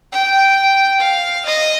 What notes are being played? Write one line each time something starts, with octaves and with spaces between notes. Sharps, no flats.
G5
F5
D#5